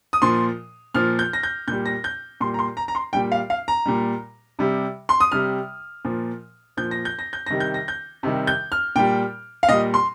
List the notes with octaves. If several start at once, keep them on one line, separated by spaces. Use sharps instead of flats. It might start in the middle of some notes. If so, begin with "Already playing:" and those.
D#6
A#2 F3 C6
A#2 F3 F6
G6
A#6
G6
A#2 G3 G6
A#6
G6
A#2 G3 C6
A#5
C6
A#5
A#5
C6
A#2 G3 G5
F5
F5
A#5
A#2 G3
C3 G3
C6
D#6
C3 G3 F6
A#2 F3
A#2 F3 G6
A#6
G6
A#6
G6
C3 D#3 G3 A#6
G6
A#6
G6
C3 D#3 G3
G6
F6
A#2 G3 G5
F5
A#2 G3 D#5
C6